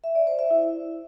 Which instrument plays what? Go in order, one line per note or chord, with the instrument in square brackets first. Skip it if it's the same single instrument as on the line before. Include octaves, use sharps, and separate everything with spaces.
[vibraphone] E5
D5
C5
E5
E4